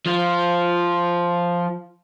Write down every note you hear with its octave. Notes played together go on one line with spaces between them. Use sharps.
F3 F4